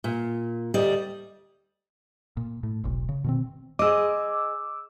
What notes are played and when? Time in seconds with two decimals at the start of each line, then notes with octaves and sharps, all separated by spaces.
0.04 A#2
0.74 D2 G3 D5 D#5
2.37 A#2
2.63 A2
2.84 E1 B1
3.09 C#3
3.24 B2 D#3 C4
3.79 G#4 C5 D#5 D6 E6